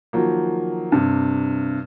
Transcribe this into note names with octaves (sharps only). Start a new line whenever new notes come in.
D#3 F3 F#3 A#3
G2 C3